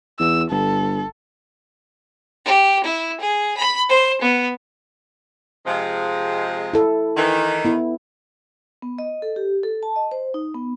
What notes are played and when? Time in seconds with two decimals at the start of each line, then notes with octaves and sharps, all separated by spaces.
0.20 E2 E6
0.51 G1 A4
2.44 G4
2.84 E4
3.20 G#4
3.57 B5
3.89 C5
4.21 B3
5.66 C3 F3 G#3
6.73 E4 A4
7.17 D#3 E3
7.65 B3 E4
8.82 B3
8.98 D#5
9.22 A4
9.36 G4
9.63 A4
9.83 A5
9.96 D#5
10.12 C5
10.34 D#4
10.55 B3